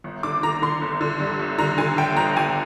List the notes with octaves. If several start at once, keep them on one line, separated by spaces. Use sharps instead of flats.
G1
D3 D6
D3 A#5
D3 C6
G1
D3
G2
G1
D3 A#5
D3 G#5
G1 G5
G1 A#5
G1 G#5